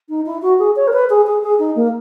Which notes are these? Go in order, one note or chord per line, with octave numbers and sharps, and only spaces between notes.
D#4
E4
F#4
G#4
C#5
A#4
B4
G#4
G#4
G#4
D#4
A#3